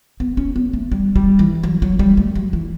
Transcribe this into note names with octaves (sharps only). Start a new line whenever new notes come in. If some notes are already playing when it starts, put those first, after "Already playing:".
B3
C#4
B3
A3
G3
G3
E3
F#3
F#3
G3
A3
F#3
E3